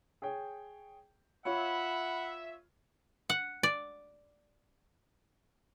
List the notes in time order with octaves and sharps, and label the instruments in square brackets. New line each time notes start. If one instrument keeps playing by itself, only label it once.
[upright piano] G#4 C#5 G5
[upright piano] F4 C#5 [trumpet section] E5 [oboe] F#5 [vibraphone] B5
[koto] F#5
D5